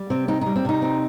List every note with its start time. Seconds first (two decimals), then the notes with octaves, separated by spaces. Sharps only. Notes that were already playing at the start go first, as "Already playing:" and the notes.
Already playing: G3
0.10 C3 C4
0.28 C4 D#4
0.41 G3 D#4
0.56 C4
0.65 C3 D#4
0.82 C4